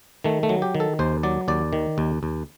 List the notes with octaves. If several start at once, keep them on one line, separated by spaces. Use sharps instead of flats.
D#3 A3
A3
F#3
G4
D#3
A4
D#2 C5
F#3 D5
D#2 D5
D#3
D#2
D#2